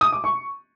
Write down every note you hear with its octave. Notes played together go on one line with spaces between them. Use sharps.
D#6
D6
C#6